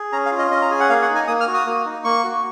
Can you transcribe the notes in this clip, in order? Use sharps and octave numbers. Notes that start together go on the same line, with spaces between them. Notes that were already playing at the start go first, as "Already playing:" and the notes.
Already playing: G#4
C#4 A#5
F5
F4
D#5
C#4 D#5
A#5
G#4 G#5
F#5
A#3 F5
F#5
D#4
G#5
A#3 D#6
F6
F#4
D#6
A#3
D#4
A#3 C#6
F#4